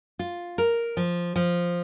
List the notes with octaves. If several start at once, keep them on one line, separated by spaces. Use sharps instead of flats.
F4
A#4
F3
F3